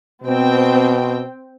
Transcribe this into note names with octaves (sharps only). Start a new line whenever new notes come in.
B2 C4 G5